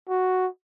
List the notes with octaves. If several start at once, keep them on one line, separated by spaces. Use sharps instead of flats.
F#4